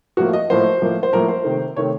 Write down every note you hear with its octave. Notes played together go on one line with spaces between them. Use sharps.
A2 F3 A#3 F#4
D#5
A2 F3 A#3 C5
A2 F3 A#3
C5
A2 F3 A#3 A#4
C5
C3 D#3 A3
C3 D#3 A3 C#5